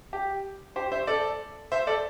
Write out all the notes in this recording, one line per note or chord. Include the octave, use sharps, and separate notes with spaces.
G4
G4 C5
C5 E5
A4 D5
C5 E5
A4 D5